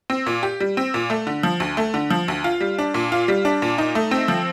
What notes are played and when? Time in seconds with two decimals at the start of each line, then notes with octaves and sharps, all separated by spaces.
0.10 C4
0.27 A#2
0.43 G4
0.60 G3
0.77 C4
0.94 A#2
1.10 A3
1.27 D3
1.43 F3
1.60 D2
1.77 A3
1.94 D3
2.11 F3
2.28 D2
2.44 F4
2.61 G3
2.78 D4
2.94 A#2
3.12 F4
3.28 G3
3.45 D4
3.62 A#2
3.78 D#4
3.95 A3
4.11 C4
4.28 F3